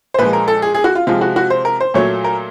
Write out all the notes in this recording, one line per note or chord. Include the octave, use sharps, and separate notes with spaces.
C5
A#2 F3 G#3 B4
A#4
A4
G#4
G#4
F#4
F4
C3 F3 G#3 F4
F#4
F#4
C5
A#4
C5
A#2 F#3 A3 C#5
A#4